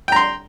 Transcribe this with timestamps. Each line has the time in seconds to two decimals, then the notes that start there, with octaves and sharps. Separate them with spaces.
0.08 G5
0.12 A#5
0.16 C6